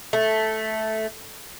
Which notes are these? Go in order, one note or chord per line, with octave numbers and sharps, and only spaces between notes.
A3